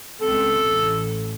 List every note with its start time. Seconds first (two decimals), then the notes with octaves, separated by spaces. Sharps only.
0.21 C#2 C4 A4
0.61 A1 A2